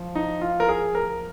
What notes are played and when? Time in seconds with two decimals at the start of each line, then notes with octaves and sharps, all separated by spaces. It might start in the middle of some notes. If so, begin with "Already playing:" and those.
Already playing: F3
0.15 D#4
0.42 F4
0.60 A#4
0.69 G#4
0.95 A#4